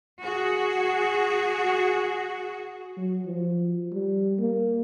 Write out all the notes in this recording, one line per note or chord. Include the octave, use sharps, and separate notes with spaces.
F#4 G#4
F#3
F3
G3
A#3